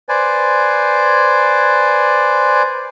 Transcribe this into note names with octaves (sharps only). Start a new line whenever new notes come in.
B4 C5 D5 G#5